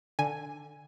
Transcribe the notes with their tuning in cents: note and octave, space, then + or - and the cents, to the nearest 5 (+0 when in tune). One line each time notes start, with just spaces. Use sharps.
D3 +10 G#5 +0